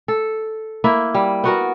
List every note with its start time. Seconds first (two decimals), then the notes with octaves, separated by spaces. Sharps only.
0.08 A4
0.84 A#3 E4
1.15 G3
1.44 B3 F#4 A#4